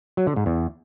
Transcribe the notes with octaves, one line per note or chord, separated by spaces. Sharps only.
F#3
D3
G#2
E2